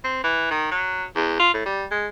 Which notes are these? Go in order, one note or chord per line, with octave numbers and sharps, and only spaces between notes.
C4
E3
D#3
F#3
E2
F4
A2
G3
G#3